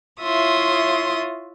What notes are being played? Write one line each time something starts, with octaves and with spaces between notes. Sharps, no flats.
E4 F4 C#5 E5 C6 D#6